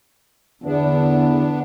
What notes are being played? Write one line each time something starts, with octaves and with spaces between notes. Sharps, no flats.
E2 D3 B3 D4